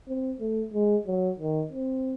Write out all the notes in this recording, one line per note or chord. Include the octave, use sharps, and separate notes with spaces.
C4
A3
G#3
F#3
D#3
C4